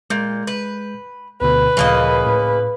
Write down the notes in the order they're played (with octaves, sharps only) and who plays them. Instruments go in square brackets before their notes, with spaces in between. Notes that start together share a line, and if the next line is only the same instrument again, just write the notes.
[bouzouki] A#2 [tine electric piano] G#3 G6
[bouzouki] B4
[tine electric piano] D2 B2 D3 [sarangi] B4
[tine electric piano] D2 A#2 F3 [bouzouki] C#3 A#3 D#5
[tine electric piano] A2